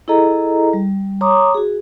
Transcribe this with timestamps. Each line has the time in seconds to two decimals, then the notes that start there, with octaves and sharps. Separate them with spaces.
0.08 E4 G#4 A4 D#5 A#5
0.73 G3
1.21 C#5 A#5 C6 D6 D#6
1.55 F#4 G#4